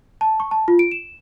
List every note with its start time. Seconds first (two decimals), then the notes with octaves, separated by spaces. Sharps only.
0.21 A5
0.40 C#6
0.51 A5
0.68 F4
0.79 D7
0.91 E7